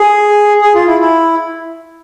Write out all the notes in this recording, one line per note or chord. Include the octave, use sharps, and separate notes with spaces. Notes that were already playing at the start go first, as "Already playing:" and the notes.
Already playing: G#4
G#4
F4
E4
E4